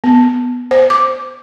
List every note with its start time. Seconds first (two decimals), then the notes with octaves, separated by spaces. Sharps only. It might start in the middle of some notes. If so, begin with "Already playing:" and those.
0.04 B3
0.71 C5
0.90 D6